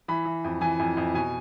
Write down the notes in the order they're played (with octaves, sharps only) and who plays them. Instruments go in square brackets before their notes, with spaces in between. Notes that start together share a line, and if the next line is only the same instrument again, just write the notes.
[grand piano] E3 B5
E3
F2
E3 G#5
F2
F2
B2 G#5